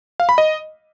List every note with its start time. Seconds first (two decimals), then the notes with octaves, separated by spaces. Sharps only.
0.20 F5
0.29 B5
0.38 D#5